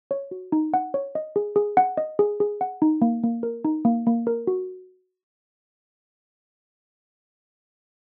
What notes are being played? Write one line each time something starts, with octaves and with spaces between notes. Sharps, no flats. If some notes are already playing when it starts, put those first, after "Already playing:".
C#5
F#4
D#4
F#5
C#5
D#5
G#4
G#4
F#5
D#5
G#4
G#4
F#5
D#4
A#3
A#3
A#4
D#4
A#3
A#3
A#4
F#4